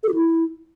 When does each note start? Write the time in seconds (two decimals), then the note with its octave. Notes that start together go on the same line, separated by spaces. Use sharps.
0.03 A4
0.09 F#4
0.14 E4